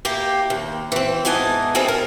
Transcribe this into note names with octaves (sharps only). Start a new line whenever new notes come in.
A#3 E4 G4
D#2
E3 C4
G#2 E3 B3 D#5 G#5 A5
G3 G#3 C4 G#4 A4
A#4